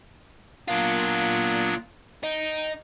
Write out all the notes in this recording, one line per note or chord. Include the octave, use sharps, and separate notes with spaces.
F#3 A#3 B3 D4 F4
D#4 G5